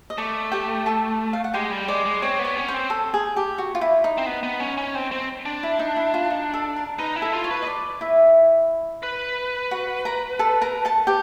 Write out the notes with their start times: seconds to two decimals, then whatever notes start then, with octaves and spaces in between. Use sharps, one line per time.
0.10 D#5
0.18 A3 D5
0.52 G4 G5
0.86 A4 A5
1.33 F5
1.44 F#5
1.53 G#3 G4 G5
1.71 G3
1.88 G#3 D5
2.06 G#3
2.22 C4 C#5
2.39 B3
2.44 C#5
2.57 C#4
2.68 C5
2.74 C4
2.90 A4
3.14 G#4
3.36 G4
3.58 F#4
3.75 F4
3.81 E4
4.04 D#4
4.18 C4
4.26 B3
4.43 B3
4.60 C#4
4.77 C#4
4.95 C4
5.12 C4
5.45 D4
5.63 E4
5.79 D#4
5.96 E4
6.14 F4
6.30 D#4
6.54 A4
6.76 A#4
6.98 D#4 B4
7.16 E4
7.22 A4
7.33 F4
7.44 C#5
7.51 B4
7.62 D#5
7.67 D5
8.01 E4 E5
9.03 B4
9.71 F#4 F#5
10.05 A#4 A#5
10.39 A4 A5
10.62 A#4 A#5
10.85 A4 A5
11.07 G4 G5